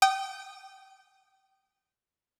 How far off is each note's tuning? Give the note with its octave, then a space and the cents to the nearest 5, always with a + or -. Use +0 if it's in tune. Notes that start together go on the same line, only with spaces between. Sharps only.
G5 -25 D#6 -20